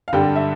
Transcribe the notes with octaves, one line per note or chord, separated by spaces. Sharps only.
F5
G2 D3 G3 G5
E5